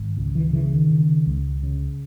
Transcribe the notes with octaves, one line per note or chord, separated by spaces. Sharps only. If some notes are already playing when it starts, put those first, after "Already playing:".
Already playing: G#1
C#2
E3
C#3 E3
D#3
C#3
C#2
C#3